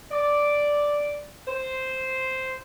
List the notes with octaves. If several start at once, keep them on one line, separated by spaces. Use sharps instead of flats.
D5
C5